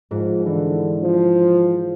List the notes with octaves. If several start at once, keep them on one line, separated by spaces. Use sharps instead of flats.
G#2 F3
D3 E3
F3